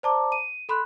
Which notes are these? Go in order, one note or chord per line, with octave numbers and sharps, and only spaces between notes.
C5 D5 A5 A#5 D6
D#7
A4 B5 C6 F#6